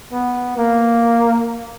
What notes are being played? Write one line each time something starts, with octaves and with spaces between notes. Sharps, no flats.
B3
A#3